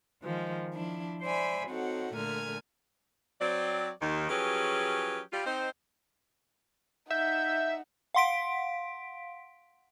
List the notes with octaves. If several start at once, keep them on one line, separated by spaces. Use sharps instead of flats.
D#3 F3 G#3
F3 D4 E4
C5 D5 E5 G#5 B5
C4 D#4 F#4 A4 C#5 F#5
A#2 D3 A3 A#4 G#5 F6
F#3 C4 D5
D#2 D#3
F3 F#3 C#4 G4 G#4 B4
G3 F4
C4 D#4 C5
D#4 E5 F#5 G6
F5 F#5 C6 B6 D7